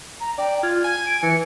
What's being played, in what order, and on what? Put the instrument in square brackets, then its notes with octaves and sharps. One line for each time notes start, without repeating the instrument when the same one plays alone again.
[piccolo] A#5
[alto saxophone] D5 [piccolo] G5
[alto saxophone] F4 [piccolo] G#6
[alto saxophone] G#5 [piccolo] G#6
[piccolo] D7
[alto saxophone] E3 [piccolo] C#7